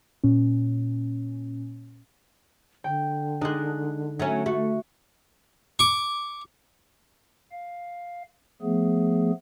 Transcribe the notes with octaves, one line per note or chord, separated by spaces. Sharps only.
A#2 C#4
D3 G5
G#3 D4 D#4 F#6
F#3 A3 C#4
A3 F#4
C#6 D6
F5
F3 A3 B3 G#4